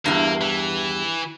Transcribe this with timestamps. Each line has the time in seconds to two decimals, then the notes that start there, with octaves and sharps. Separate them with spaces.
0.06 E2 G2 A#3
0.41 E3